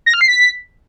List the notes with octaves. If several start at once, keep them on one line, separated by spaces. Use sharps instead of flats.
A#6
F6
C7
B6